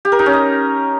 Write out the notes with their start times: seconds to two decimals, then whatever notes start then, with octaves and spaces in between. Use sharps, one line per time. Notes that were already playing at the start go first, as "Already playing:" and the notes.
0.05 G4
0.12 A#4
0.19 D#4
0.26 C#4
0.33 D#5